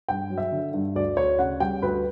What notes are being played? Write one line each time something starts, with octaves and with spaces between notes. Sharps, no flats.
G2 G5
F#3
E5
D3
G2
D2 D5
D2 C#5
C#3 F#5
G3 G5
D2 B4